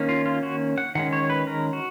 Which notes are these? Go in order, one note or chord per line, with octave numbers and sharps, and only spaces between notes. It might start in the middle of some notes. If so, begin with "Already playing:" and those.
Already playing: D#3 A#3 C#4
F4
F4
F#4
F#5
D#3 G#3 C#4 F#5
C#5
B4
A#4
F#4